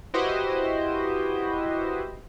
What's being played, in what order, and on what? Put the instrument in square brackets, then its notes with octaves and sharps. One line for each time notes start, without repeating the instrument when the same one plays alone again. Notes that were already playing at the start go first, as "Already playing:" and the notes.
[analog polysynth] E4 F#4 G4 B4 C5 D#5